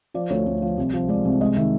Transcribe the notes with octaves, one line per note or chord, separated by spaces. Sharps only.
F3 D5
D2 C#5
D2
F3
C2
F3
G#3 D5
C2
G#3 D#5
D#3 E5